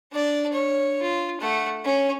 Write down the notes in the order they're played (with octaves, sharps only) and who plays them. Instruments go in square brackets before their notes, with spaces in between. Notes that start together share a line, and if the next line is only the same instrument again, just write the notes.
[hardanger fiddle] D4 D5
C#5
F4
A3 F#5
C#4